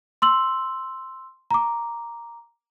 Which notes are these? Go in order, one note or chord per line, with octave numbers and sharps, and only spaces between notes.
C6 E6 F#7
A#5 D6